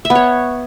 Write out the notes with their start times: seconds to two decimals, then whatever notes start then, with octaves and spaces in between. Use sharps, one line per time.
0.05 E5
0.10 B3
0.15 C#5